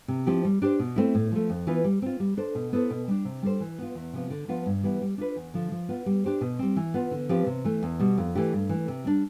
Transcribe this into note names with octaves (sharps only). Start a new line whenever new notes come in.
C3
F3 C4 E4 G4
G3
D4 G4 C5
B2
A3 C4 E4
A2
F3 A3
F2
E3 B3 F4 B4
G3
C4 F4
G3
D4 A4 C5
B2
B3 E4 A4 C5
B2
G3 D4
C3
G3 D4 A4 C5
E3
B3 F4
E2
C3 F3 B3 F4
D3
F3 B3 F4
G2
E3 G3 B3 E4
G3
D4 F4 B4
E2
D3 F3
F3
B3 F4
G3
D4 G4 C5
B2
G3 C4
E3
B3 F4
D3
F3 C4 G4 B4
C3
E3 A3
E2
B2 G3
F2
E3 A3 D4 G4
G2
E3 A3
C3
G3 D4